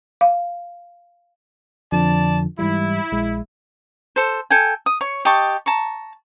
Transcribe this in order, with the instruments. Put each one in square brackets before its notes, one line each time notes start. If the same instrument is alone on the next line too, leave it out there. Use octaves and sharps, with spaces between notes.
[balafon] F5
[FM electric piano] F2 D3 F3 [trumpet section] D5 A5
[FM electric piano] G#2 E3 G3 [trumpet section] E4
[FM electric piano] A#1 G#3 E5
[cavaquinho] A4 C5
A4 G5 G#5
D#6
C#5 C#6
G4 D#5 A5 C#6
A5 A#5 C#6